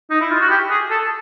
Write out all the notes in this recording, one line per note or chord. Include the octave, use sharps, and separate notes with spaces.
D#4
E4
F4
F#4
G4
G#4
A4